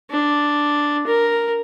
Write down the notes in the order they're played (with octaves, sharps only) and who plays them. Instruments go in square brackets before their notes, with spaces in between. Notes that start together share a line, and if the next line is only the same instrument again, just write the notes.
[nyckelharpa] D4
A#4